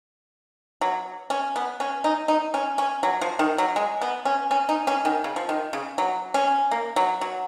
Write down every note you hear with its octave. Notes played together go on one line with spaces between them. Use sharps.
F#3
C#4
B3
C#4
D#4
D#4
C#4
C#4
F#3
F3
D#3
F#3
G#3
B3
C#4
C#4
D#4
C#4
D#3
C#3
F3
D#3
C#3
F#3
C#4
A#3
F#3
F#3